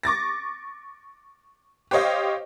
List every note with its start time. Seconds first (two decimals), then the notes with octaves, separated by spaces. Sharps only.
0.03 C#6 D6 A6 A#6
1.91 G4 C5 C#5 D#5 F5